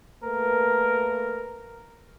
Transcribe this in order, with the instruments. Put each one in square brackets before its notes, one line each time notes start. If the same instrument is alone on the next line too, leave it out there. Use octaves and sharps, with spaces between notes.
[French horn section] A3 A#3 B4 [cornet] A#4